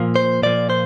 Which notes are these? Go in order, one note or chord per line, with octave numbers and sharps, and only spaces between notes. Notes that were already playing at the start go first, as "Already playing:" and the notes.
Already playing: A#2 F3 A#3
C5
A#2 F3 A#3 D5
C5